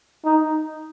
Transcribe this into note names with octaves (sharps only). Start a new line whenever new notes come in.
D#4